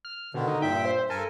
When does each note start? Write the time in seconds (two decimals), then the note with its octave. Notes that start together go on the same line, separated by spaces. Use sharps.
0.05 F6
0.34 B2 D3 D#3
0.48 D#4
0.62 G2 A#2 E5 G5
0.85 C5
1.10 G2 A4 A#4 G#5